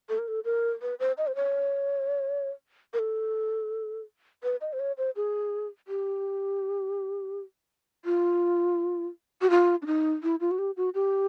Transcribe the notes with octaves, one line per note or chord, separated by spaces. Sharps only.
A4
A#4
A4
A#4
B4
C5
D#5
C5
C#5
A#4
A4
B4
D#5
C5
C#5
C5
G#4
G4
F4
F#4
F4
D4
D#4
E4
F4
F#4
G4
F#4
G4